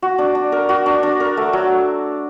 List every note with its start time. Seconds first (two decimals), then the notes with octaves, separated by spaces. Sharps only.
0.02 F#4
0.18 D4
0.35 D4
0.52 A#4
0.69 F#4
0.86 D4
1.03 D4
1.20 A#4
1.37 A3
1.53 F#3